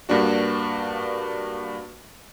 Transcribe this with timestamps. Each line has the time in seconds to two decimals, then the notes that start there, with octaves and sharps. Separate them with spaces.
0.09 G2 A#3 D4 F#4